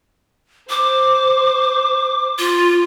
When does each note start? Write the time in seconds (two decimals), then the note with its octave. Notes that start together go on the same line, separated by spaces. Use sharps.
0.70 C5 D6
2.39 F4